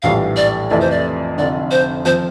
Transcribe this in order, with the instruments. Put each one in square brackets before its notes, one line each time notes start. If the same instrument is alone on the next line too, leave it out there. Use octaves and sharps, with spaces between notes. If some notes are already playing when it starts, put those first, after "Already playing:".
[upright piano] A#1 A2 E3 G3 [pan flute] F5
[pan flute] D5
[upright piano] F2 C3 E3 A3 E4 [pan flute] D5
[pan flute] C5
D5
[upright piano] F1 F2 D3 [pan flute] D5
[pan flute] C5
[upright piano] F3 C4 [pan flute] C5